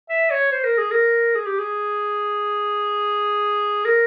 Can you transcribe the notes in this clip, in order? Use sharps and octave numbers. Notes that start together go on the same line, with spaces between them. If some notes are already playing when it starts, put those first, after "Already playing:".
E5
C#5
C5
A#4
G#4
A#4
G#4
G4
G#4
A#4